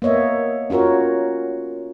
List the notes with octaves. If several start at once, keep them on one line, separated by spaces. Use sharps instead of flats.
A#3 B3 C#5 D#5 E5
C#4 F4 F#4 A#4 C#5